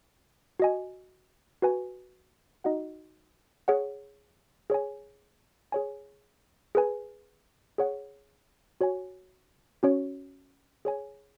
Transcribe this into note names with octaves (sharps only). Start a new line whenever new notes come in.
F#4 D#5 G#5
F#4 B4 G#5
D#4 F#4 D#5 F#5
G#4 C#5 F#5
G#4 C#5 G#5
G#4 C#5 G#5
G#4 B4 G#5
G#4 C#5 F#5
F#4 C#5 G#5
C#4 F#4 C#5
G#4 C#5 G#5